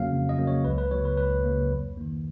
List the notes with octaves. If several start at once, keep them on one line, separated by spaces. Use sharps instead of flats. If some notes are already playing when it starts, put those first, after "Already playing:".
Already playing: F2 C#3 F#3 A#3 C#4 F5
F2
D#5
C#3 F#3 A#3 C#4
C#5
C#2 B4
B4
C#3 F#3 A#3 C#5
B4
C#2 B4
C#3 F#3 A#3
F2
D#3 A#3